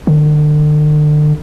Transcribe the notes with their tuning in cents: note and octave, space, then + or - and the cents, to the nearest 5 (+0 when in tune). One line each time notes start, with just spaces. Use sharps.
D3 +40